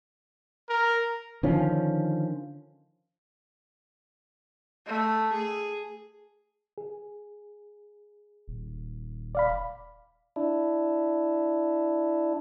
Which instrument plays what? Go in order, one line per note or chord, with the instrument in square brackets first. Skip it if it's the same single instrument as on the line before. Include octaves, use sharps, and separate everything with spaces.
[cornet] A#4
[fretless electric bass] D3 D#3 F3 C#4
[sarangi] A3
G#4
[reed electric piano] G#4
[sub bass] D#1
[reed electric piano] D5 F5 B5
[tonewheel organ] D4 E4